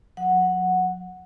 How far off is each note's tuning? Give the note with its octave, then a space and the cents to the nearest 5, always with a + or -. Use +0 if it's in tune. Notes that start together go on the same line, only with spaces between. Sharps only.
F#3 -40 F#5 -5